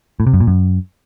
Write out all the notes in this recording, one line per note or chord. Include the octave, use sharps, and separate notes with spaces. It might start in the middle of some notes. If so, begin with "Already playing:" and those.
A2
C3
F#2
A#2
F#2